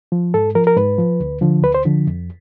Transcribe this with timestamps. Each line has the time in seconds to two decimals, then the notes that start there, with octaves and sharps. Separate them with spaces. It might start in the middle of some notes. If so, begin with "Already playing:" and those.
0.12 F3
0.34 G#2 A4
0.55 F3 A#4
0.67 A#4
0.77 G#2 B4
0.98 F3
1.20 D2
1.41 D3 F3
1.63 D2 B4
1.74 C5
1.85 D3 F3
2.07 F2